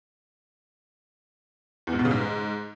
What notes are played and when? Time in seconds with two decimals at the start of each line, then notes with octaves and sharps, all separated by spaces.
1.87 E2
1.93 G#2
1.99 B2
2.05 C#3
2.11 G#2